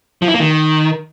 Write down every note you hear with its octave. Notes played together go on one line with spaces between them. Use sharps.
F3
E4
A#3
D#3